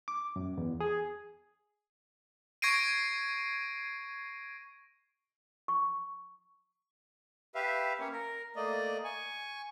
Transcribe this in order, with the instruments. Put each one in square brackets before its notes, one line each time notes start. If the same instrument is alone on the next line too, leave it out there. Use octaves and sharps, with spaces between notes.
[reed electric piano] D6
F#2
E2
G#4
[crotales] C#6 G#6 A#6 C7 D7 D#7
[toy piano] C#6
[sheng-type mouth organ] G4 B4 E5 F5
A#3 C#4 C#5
A#4
A3 A#3 D5 D#5
G#5 C#6